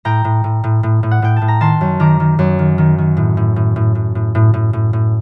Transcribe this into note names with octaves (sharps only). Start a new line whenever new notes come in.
A2 G5 A#5
A2
A2
A2
A2
A2
F#5
A2 G5
A5
A2
A#5
D#3 A5 C6
F#2
D#3 A#5 D6
D#3
F#2
D#3
D#3
D#3
A2
A2
A2
A2
A2
A2
A2
A2
A2
A2